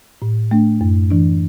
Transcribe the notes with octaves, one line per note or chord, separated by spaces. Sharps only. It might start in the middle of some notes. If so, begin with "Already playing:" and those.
A2
A3 D4
F#2
E3 D4